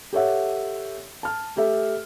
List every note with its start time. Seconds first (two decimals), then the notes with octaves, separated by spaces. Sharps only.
0.13 G4 A4 C#5 E5 F#5
1.23 A5 F6
1.56 A3 G4 A4 E5